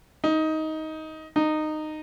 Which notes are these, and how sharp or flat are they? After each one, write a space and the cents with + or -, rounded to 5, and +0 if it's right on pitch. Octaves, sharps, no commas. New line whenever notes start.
D#4 +15
D#4 -15